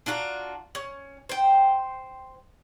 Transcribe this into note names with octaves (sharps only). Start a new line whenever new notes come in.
D4 F4 F#4 A#5
C#4
C5 G5